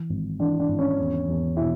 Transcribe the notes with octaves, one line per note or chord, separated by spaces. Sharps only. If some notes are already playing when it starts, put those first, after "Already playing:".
Already playing: E3
G#1
E3 D4
D4
G#1
C#4
E2
E2
B2 E4